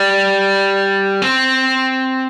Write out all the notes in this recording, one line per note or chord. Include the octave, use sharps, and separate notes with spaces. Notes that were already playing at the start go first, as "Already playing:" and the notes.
Already playing: G3
C4